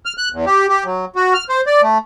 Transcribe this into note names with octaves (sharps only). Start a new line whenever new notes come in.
F6
F#6
E2
G4
G4
F#3
F#4
F6
C5
D5
A3